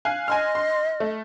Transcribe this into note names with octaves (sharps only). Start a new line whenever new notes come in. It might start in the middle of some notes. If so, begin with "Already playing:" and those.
F5 G#5 F#6
D#5 G#5 C6 F6
C6
A3